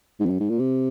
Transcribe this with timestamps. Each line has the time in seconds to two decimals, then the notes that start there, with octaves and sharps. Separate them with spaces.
0.20 G#2
0.26 F2
0.30 F#2
0.40 G#2
0.50 A#2
0.59 C3